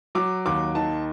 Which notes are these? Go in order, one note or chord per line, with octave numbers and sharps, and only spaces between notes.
F#3 D6
D#2 D6
D#3 A5